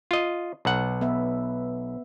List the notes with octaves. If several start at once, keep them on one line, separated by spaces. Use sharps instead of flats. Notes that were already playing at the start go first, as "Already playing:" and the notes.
F4 D#5
B1 F#5
B3 B4 E5